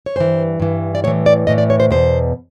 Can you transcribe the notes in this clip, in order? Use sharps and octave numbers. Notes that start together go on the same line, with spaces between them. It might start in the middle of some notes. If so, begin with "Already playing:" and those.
C#5
G2 E3 C5
G2 E3
D5
A2 E3 C#5
D5
A2 E3 D#5
D5
C#5
C5
E2 B2 C5